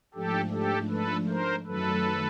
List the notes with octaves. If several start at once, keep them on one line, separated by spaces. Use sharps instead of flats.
G#2 F3 A3 D4 G4 A4
G4 A4
A4 B4
A#4 C5
F#2 D#3 F#3 A3 A4 B4